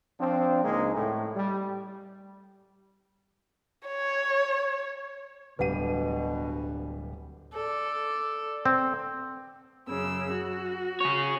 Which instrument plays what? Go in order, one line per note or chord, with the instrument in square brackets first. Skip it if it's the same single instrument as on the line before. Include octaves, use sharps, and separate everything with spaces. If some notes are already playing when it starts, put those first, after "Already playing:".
[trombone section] F3 C4 D4
C#2 G#3 A#3 C4 D#4 G#4
A2
G3
[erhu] C#5
[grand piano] D1 G3 D#7 [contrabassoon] G2 [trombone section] B2 [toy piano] B4 F#5
[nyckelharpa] A4 D5
[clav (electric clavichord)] C4
[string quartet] F#2 C#3 E6
F#4
[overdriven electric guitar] G#4 C#5